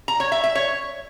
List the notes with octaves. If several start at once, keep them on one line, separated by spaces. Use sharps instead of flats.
A#5
C#5
E5
E5
C#5